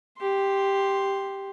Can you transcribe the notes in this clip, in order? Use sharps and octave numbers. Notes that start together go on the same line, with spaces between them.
G4 C6